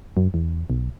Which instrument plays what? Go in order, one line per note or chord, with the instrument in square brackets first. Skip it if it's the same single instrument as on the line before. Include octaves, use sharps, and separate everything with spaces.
[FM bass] F#2
E2
B1